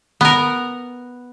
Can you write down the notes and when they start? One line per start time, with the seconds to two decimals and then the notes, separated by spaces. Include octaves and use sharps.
0.21 B3 A#4